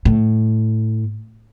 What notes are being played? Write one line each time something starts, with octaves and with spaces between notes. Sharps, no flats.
A2